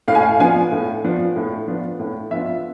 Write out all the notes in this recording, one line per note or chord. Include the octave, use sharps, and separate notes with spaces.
A2 F5
G#5
F5
F3 B3 D4 F4 G#5
A2
F3 B3 D4 F4
A2
F3 B3 D4 F4
A2
F3 B3 D4 F4 E5